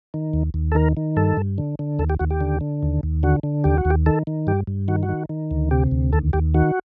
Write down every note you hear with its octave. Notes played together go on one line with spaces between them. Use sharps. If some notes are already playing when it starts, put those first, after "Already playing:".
D#3
D#2
D#2
A4
D#3 A#4
D#3
G2 A4
G2
D3
D3
D#2 A4
G4
D#2 F#4
G4
D3
D3
D#2
D#2
D3 F#4
D3
D#2 G4
F#4
D#2
G4
D#3 A4
D#3
G2 G4
G2
D#3 F#4
F#4
D#3
D#3
D2
C3 G4
D2
D#2 A4
D#2 G4
D#3 F#4